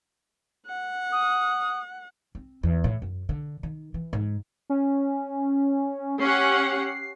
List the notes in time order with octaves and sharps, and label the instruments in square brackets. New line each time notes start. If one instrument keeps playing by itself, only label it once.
[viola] F#5
[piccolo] D#6
[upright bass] C4
E2
A2
F#2
D3
D#3
E3
G#2
[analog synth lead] C#4
[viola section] C#4 G4 F#5 [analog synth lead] C7